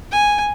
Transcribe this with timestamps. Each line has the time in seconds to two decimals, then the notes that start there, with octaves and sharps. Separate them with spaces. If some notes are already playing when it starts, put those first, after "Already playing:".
0.11 G#5